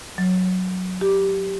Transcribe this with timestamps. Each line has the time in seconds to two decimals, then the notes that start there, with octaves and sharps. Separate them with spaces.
0.18 F#3
1.01 G4